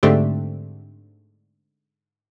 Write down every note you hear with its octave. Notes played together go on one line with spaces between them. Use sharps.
G#2 D3 A3 C4 D4 G4